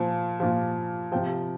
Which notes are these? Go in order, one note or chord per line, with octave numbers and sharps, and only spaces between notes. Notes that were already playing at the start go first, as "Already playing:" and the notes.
Already playing: A#2 F3
A#2 F3
C3 F3 G5